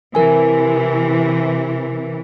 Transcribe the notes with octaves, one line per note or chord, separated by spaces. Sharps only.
C3 E3 A#4 G#5